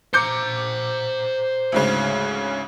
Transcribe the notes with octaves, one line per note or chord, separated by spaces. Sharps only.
C5 A#5 D6 G6 C#7
D2 G#2 C#3